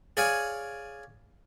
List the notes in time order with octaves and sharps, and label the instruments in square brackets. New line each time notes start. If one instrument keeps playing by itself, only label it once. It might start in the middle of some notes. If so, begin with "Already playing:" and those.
[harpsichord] G#4 C#5 D5 F5 G#5